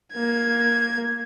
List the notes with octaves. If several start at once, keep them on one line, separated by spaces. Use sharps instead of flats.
A#3 G#6